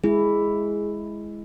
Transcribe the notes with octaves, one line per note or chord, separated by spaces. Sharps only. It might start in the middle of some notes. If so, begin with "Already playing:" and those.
G#3 E4 G#4